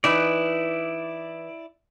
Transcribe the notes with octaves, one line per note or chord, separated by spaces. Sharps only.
E3 D#4 E4 B4 D5